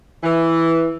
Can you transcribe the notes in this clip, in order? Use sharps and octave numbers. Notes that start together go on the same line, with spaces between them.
E3